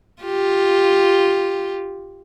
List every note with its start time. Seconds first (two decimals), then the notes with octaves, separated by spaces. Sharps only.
0.22 F4 G4